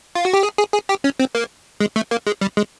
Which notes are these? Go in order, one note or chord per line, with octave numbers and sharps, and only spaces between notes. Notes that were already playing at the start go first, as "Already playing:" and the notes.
F4
F#4
G4
G#4
G#4
G#4
G4
C#4
C4
A#3
G#3
A3
A#3
G#3
G3
G#3